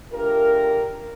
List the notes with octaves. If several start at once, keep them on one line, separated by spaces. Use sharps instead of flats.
A3 D4 F4 G4 A#4